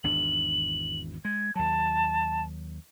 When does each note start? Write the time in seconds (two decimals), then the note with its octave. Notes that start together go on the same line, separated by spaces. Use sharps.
0.04 G#1 E2 D4 F#7
1.25 G#3 G#6
1.55 D#2 F#3 A5